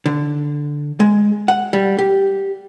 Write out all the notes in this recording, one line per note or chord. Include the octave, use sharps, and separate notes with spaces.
D3
G#3
F#5
G3
G4